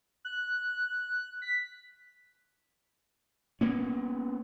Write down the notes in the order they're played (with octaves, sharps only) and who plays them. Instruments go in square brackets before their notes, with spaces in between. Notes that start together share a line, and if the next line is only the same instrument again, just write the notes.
[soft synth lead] F#6
B6
[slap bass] A#3 B3 C#4